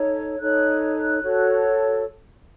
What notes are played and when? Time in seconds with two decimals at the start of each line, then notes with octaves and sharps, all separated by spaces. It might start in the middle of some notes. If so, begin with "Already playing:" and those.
Already playing: D#4 A4 C#5
0.39 D#4 A4 C#5 F#6
1.22 F#4 A4 C#5